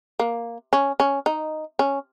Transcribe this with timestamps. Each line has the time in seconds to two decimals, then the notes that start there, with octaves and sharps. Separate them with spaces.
0.20 A#3
0.73 C#4
1.00 C#4
1.26 D#4
1.79 C#4